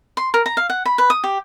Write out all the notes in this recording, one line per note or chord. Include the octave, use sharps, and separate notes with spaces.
C6
A#4
A#5
F5
F#5
B5
B4
D#6
G4